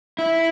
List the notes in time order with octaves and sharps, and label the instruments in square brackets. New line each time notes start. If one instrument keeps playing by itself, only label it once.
[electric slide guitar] E4